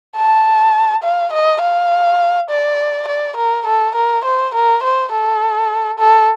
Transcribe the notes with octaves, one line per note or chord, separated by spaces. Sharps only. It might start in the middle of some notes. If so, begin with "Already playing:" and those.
A5
F5
D#5
F5
D5
D5
A#4
A4
A#4
C5
A#4
C5
A4
A4